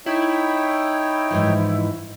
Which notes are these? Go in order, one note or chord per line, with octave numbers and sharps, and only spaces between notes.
D#4 E4 C#5 G5
G#2 E3 F3